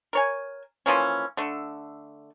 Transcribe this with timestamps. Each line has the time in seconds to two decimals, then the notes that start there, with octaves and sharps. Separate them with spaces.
0.13 A#4 C#5 G#5
0.86 E3 F3 A#3 C#4
1.37 D3 A3